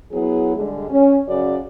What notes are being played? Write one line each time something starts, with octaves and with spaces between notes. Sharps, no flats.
F#3 B3 E4 G#4
D3 G3 G#3
C#4
F#2 C#3 F#4 D5